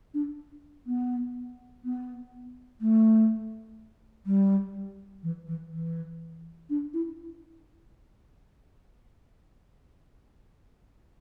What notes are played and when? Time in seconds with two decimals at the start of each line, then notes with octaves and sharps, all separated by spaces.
0.14 D4
0.87 B3
1.85 B3
2.81 A3
4.26 G3
5.23 E3
5.48 E3
5.72 E3
6.70 D4
6.94 E4